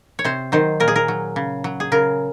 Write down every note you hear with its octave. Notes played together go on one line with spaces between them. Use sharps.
C#5
C3 C5
D#3 F#3 C5
A#2 A#4
G#4
A#4
F#3
C#3
F#3
G#4
C#3 A#4